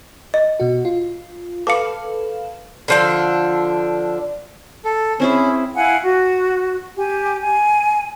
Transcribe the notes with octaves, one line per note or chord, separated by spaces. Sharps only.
D#5
B2 F#4
F4
A4 B4 F5 D6 C#7
D3 F3 D4
A4
C4 C#4 E4 G#4
E4 F5 F#5 G#5
F#4
G4 G#5
G#5